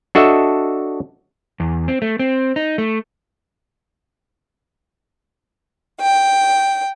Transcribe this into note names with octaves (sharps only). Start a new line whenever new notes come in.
D4 F#4 A4 D#5 E5
E2
C4
A3
C4
D#4
A3
G5